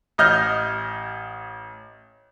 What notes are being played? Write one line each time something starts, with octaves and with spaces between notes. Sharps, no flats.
A1 D#5 F6 G6